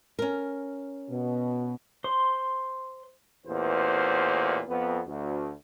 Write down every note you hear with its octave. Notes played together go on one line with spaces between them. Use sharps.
C#4 A#4
B2
C5 C6
A1 E2 A#2 B4 C5
F2 B3
D2